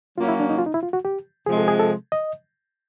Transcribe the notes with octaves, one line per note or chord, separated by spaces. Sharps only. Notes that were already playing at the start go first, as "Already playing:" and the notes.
F#3 A#3 C#4 F4
E4
D4
D#4
F4
D#4
E4
F4
F#4
G4
C3 F3 G#3 G#4
A4
G#4
A4
D#5